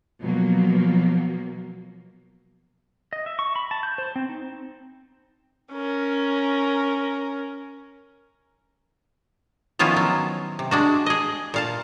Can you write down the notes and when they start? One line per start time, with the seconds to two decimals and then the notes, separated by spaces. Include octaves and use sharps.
0.20 B2 F3 F#3 A#3
3.13 D#5
3.26 E5
3.39 C#6
3.56 B5
3.71 A5
3.83 G6
3.98 C5
4.16 C4
4.29 D#4
5.73 C#4 A#4
9.79 D#3 F3 B3 C#4 E4 F4
9.96 F#3
10.59 C3
10.71 G#3 D4 F#4
11.06 G#4 D#5
11.54 A#2 F5 A5